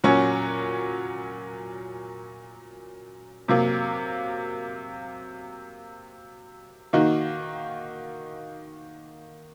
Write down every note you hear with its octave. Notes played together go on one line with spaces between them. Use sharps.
A#2 F#3 C#4 F#4
C3 F#3 A#3
D#3 A#3 D#4 F#4